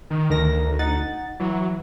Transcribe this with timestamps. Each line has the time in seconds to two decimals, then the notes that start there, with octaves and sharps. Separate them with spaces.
0.10 D#3
0.30 D2 D#3 A#4 A#6
0.79 D#4 F#5 A6
1.40 E3 F#3